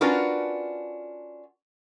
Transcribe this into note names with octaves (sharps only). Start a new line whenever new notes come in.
C#4 D4 F4 F#4 A#4 B4